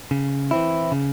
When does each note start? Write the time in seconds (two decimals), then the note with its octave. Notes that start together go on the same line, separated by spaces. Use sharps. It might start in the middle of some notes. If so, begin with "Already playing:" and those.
0.11 C#3
0.51 E3 C4 E4
0.92 C#3